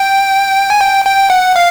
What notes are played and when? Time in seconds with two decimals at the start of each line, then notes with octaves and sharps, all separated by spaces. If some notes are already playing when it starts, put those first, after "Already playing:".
Already playing: G5
0.70 G#5
0.80 G5
1.05 G5
1.30 F#5
1.56 F5